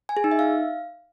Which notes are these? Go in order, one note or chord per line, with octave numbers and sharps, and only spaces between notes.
G#5
G#4
D#4
E5
F5